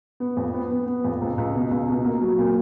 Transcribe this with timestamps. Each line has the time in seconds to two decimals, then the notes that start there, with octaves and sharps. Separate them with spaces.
0.20 B3
0.37 F2
0.53 B3
0.71 B3
0.87 B3
1.05 F2
1.21 C#2
1.38 C#2
1.54 B2
1.71 C#2
1.88 B2
2.04 A#3
2.21 F#3
2.38 A#2